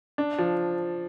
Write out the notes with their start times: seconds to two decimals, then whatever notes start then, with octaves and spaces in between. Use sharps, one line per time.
0.18 D4
0.38 F3